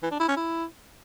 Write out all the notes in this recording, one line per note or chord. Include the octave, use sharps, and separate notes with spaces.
E3
D4
E4
C#4
E4